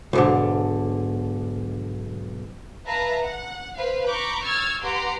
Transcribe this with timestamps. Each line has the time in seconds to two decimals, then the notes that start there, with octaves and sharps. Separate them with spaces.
0.13 B1 G#2 D3
2.86 B4 E5 F5 A5 A#5 A#6
3.22 F#5
3.77 B4 C5 F5
4.07 A#5 B5 C#6 D6 G6
4.44 C#6 E6 F6 G#6 A6
4.83 G4 B4 F#5 A#5 C6 D6